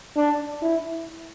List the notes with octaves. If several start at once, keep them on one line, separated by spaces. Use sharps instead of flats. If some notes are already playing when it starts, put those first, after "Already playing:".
D4
E4